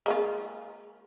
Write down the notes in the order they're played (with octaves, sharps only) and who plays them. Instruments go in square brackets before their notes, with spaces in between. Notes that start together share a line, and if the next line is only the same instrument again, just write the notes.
[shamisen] G#3 A#3 F4